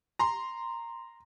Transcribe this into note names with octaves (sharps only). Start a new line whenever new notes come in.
A#5 C6